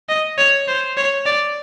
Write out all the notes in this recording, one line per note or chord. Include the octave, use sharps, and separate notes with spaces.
D#5
C#5
C5
C#5
D5